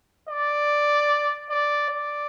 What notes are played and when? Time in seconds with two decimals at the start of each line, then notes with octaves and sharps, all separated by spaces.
0.29 D5
1.50 D5
1.90 D5